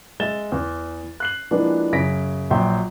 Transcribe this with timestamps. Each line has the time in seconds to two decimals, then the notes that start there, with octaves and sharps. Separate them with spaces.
0.20 G#3 E5 A6 E7 G7
0.52 E2
1.20 F#6 C7 F#7
1.51 E3 F3 G#3 A#3 B3 D4
1.93 F#2 C#3 A#6 B6 D7
2.51 A#1 F#3 E5 G5 C6